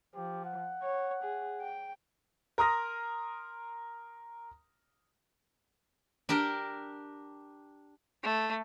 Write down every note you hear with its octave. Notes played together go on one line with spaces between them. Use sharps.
F3 G4
F#5
C#5
G#4
G5
A#4 A#5 C6 D#6 F6 A#6
D4 G4 A#4
A3